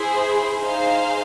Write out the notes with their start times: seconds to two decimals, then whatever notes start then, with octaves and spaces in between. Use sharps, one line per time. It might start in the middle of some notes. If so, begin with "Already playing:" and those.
Already playing: E4 G#4 C5
0.59 D#4 G#4 C5 F5